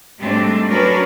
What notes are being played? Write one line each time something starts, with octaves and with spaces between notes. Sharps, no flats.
G#2 G3 A3 C4 D4
F#3 C#4 D4 F#4 A#4 B4